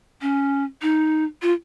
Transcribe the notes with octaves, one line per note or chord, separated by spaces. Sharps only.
C#4
D#4
F4